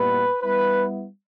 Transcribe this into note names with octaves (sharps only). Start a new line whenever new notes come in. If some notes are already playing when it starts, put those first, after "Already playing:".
Already playing: A#2 G3 B3 E4 B4
G3 B3 E4 B4